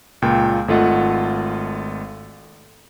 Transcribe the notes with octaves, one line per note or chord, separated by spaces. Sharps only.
C#2 A#2 G5
G#1 A3 F4 D#5 F#5